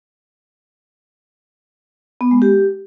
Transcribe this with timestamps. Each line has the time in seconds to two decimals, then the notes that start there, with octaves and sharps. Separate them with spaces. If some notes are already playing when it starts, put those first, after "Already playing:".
2.21 B3
2.31 G#3
2.42 G4